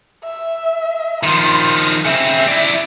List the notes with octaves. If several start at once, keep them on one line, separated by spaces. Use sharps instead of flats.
E5
D#3 F3 C6
C#3 C4 E5
E4 D5